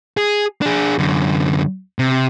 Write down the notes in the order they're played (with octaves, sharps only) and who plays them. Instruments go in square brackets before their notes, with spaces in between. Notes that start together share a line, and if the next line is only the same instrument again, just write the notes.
[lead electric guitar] G#4
D4 G#4
F#2 D3
C3